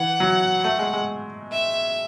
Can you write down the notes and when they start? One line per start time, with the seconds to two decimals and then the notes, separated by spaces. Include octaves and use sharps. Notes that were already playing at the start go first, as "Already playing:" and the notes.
Already playing: E3 F#5
0.20 F#3
0.64 A3
0.79 G#3
0.93 G#3
1.52 E5